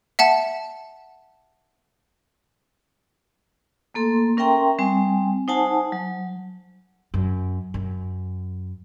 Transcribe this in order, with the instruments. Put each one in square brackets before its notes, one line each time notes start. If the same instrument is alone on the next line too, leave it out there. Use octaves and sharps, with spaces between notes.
[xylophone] E5 F#5 A5
[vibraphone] A3 A#3 A4 C6
C#4 A#4 E5 G5 A#5 C6
G3 C4 G#5
D#4 C5 F#5 G#5 A5
F#3
[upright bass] F#2
F#2